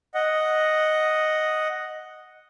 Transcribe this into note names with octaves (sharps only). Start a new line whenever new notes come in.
D#5 F#5